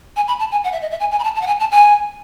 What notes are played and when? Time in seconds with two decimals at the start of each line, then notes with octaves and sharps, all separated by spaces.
0.16 G#5
0.28 B5
0.40 A5
0.52 G#5
0.64 F#5
0.73 E5
0.82 D#5
0.91 E5
1.00 G#5
1.11 G#5
1.19 B5
1.24 A5
1.35 A5
1.42 F#5
1.47 G#5
1.60 A5
1.71 G#5